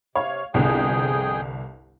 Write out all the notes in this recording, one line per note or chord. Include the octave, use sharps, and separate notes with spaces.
C3 C#5 F5
G1 C2 F2 G#4 G5